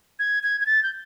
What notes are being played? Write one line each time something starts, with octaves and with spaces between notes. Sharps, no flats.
G#6
G#6
G#6
A6
G6